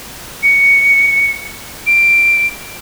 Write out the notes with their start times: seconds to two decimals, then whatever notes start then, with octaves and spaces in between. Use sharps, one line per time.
0.43 C#7
1.87 D7